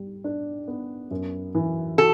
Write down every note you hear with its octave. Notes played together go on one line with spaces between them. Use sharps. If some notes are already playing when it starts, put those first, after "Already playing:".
Already playing: G3
D4
B3
F#2
E3
F#4 A4